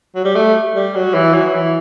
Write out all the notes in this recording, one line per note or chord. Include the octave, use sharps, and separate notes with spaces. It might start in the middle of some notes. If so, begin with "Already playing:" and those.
F#3
G3
A3
G3
F#3
E3
F#3
E3